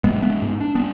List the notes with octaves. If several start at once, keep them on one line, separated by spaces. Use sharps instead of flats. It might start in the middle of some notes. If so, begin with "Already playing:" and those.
G#2 G#3 B3
G#3 B3
G#2
D4
B3 D4